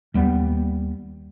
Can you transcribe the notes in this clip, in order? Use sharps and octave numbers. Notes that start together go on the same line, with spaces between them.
D#2 G3 B3